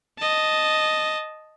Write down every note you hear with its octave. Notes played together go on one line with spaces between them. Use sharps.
D#5 A5